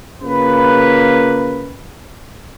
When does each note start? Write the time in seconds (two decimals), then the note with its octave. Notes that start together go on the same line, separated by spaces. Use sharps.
0.22 C#3 A#3 F4 B4